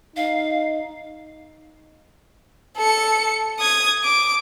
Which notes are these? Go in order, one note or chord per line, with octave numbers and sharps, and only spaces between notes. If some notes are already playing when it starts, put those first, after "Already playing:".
D#4 F5
A4 C#7
D#6 G#6
D6